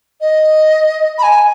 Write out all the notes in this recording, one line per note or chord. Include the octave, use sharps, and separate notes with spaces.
D#5
B5
G#5